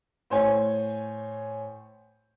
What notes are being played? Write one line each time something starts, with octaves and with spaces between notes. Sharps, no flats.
A2 C5 C#5 G#5